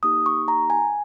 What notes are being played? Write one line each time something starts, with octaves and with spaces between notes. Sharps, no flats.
A#3 D#4 G4 D#6
C#6
A#5
G#5